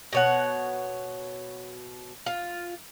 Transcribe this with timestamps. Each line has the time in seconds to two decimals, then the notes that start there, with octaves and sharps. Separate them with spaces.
0.13 B2 C#5 F#5
2.26 F4